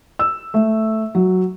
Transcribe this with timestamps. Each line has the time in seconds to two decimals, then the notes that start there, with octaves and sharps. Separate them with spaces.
0.19 E6
0.54 A3
1.15 F#3